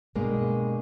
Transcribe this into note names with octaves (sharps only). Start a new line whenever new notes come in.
G2 B2 G#3 A#3